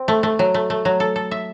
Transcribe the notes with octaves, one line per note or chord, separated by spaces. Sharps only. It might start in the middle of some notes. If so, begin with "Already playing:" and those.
Already playing: C4
A3
A3
F#3
A3
A3
F#3
A4
A4
E5